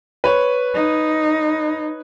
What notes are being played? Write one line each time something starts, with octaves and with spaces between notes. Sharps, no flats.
B4 C#5
D#4